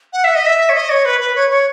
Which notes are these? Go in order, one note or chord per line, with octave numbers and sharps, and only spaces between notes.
F#5
E5
D#5
E5
C#5
D#5
C#5
B4
B4
C#5
C#5